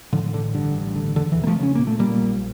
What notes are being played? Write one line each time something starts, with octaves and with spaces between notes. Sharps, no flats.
A2 D3 F3
A1 D3
G2 D3
A1
D3
E2 D3
E3
E1
A#3
F3 A3
C#3
C#4
A#2 A#3
A3
A#2 G3 A#3
A#1